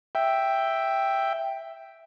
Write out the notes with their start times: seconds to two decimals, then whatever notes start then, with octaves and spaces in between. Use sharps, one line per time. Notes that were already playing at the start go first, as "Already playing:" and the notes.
0.15 E5 G5